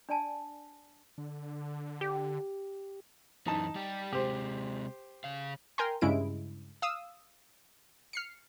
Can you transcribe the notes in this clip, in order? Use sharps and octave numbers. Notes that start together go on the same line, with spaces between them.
D4 D5 G#5 A5
D3
G4
F#2 E3 D#4 A5
G3 G4
C3 G#3 G4 C5
C#3 F5
A#4 G5 G#5 A#5 C6
G2 C#3 G#3 E4 D7
F5 D#6 E6
F6 C7 C#7